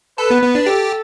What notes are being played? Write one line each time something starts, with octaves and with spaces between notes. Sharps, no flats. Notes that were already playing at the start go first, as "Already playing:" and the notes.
A4 B4
B3
B3
D4
G4 A4